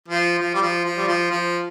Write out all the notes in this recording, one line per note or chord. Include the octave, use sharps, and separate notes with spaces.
F3
F3
G3
F3
F3
G3
F3
F3